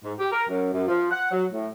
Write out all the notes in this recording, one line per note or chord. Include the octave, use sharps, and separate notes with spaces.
G#2
G4
A#4
F#2
F#2
F3
F#5
F#3
A2